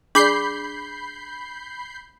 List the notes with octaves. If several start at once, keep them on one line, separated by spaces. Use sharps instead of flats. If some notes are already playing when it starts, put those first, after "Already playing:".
D4 G#4 D5 B5 D6 G6 C7